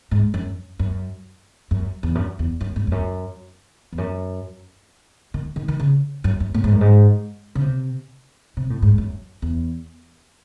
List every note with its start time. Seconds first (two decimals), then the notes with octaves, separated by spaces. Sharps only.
0.11 G#2
0.34 F#2
0.79 F#2
1.71 F#2
2.03 E2
2.15 F#2
2.39 E2
2.61 F#2
2.76 G#2
2.87 E2
2.92 F#2
3.93 E2
3.98 F#2
5.34 D#3
5.56 D#3
5.68 D#3
5.80 C#3
6.24 F#2
6.40 F#2
6.54 A2
6.64 G#2
6.73 F#2
6.81 G#2
7.55 C#3
7.61 C3
8.57 C3
8.70 A2
8.82 G#2
8.98 F#2
9.42 E2